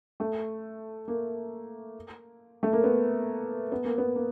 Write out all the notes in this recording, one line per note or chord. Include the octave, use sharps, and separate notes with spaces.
A3
A#3
A3
A#3
B3
B3
A#3
B3
A#3